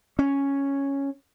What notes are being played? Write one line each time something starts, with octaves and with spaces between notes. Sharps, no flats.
C#4